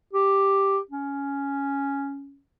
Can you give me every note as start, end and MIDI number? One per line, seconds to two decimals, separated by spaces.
0.13 0.79 67
0.91 2.40 61